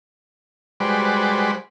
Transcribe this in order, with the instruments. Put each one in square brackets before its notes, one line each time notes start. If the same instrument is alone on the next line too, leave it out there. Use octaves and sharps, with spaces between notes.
[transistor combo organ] G3 G#3 F#4 B4 C5 D5